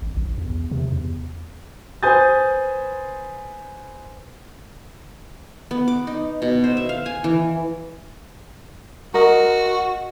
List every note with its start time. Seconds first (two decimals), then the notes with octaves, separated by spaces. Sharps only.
0.02 G#1
0.17 B1
0.38 E2
0.71 C3
0.92 E2
2.03 B4 C5 G#5 D#6 G6 A6
5.71 B3
5.88 D6
6.07 D#4
6.42 B2
6.64 C5
6.77 E5
6.89 F5
7.06 G#5
7.24 E3
9.14 F#4 A#4 D#5